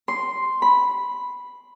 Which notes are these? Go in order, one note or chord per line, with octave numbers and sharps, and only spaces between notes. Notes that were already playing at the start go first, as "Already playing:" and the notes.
C6
B5